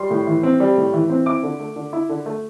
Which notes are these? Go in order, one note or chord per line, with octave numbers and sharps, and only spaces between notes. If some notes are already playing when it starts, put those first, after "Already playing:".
Already playing: G3 C6
A2
E3
C4
G3
A2
E3
C4
E4 D6
D3
A3
D3
E4
D3
A3